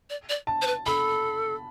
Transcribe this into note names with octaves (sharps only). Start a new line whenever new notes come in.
D5
D5
A5
C5
B4
A4 B5